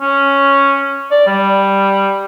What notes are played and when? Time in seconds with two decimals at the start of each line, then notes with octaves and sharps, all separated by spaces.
0.01 C#4
1.11 D5
1.27 G3